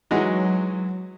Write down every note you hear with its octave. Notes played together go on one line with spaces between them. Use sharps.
E3 F#3 G#3 D#4 F#4